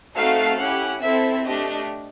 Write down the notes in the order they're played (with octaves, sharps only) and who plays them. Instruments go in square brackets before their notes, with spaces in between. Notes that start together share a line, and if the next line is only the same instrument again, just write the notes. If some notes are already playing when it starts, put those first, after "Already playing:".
[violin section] A3 C4 D#4 F#4 A4 F5
C#4 E4 G4 F#5
C4 E4 A4 E5
A3 D4 G4 D#5